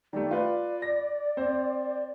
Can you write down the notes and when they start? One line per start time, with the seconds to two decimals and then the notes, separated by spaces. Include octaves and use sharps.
0.13 D#3 G3 A3 D5
0.31 F4 B4 D5
0.82 A#6
1.37 C4 C5